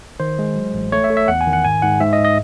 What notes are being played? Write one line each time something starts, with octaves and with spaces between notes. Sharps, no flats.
D#3 C5
G#3
F#3
A1
A3 C#5
E5
A3
E5
E2 F#5
G#5
D#3
F#5
G#2 G#5
G#2 F#5
G#2 E5
D#5
G#2
D#5